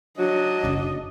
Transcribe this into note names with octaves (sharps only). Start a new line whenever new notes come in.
F#3 D4 D#5
F#1 C#3